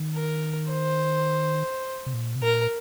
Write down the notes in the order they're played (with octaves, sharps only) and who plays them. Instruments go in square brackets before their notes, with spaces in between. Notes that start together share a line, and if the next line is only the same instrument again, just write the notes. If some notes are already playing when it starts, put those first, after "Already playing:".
Already playing: [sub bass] D#3
[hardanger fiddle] A#4
C5
[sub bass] C3
A#2
C3
[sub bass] A#2 [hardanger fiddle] A#4